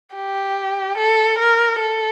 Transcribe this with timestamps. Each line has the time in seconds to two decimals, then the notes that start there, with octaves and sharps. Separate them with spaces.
0.14 G4
0.97 A4
1.39 A#4
1.81 A4